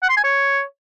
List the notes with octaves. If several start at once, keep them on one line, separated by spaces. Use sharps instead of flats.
F#5
C6
G#5
C#5